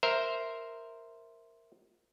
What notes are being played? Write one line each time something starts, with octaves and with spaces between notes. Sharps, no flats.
A#4 C5 E5